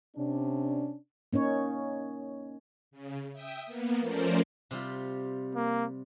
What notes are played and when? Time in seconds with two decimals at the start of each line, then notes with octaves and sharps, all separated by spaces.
0.16 C3 C#4 D4
1.33 A#3 C#4 D#4 C#5
2.91 C#3
3.32 E5 G5 D#6
3.66 A#3 B3
3.99 F3 A3 C#4 A#4 C5 D5
4.71 C3 G3 F4
5.55 A#3